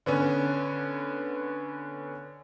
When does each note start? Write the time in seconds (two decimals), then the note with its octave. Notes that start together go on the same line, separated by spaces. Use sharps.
0.06 D3 B3 C#4